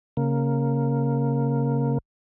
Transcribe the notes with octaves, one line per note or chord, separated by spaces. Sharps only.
C#3 A#3